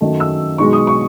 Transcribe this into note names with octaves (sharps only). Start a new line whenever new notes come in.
F#2 D#3 F#3 A3
E6
B1 B2 G#3 D#4 C#6
D#6
C#6